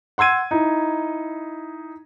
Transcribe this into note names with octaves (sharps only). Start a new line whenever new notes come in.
F#5 C6 E6 G#6 D#7
D#4 E4